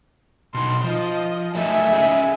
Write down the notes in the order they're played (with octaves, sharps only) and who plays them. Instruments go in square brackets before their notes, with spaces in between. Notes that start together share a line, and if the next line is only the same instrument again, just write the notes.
[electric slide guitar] B2 D#4 [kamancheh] C6
[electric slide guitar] F3 [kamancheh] D#5
[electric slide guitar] F#3 A3 D#4 [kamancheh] E5 G#5
[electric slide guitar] C#4 D#4 G#4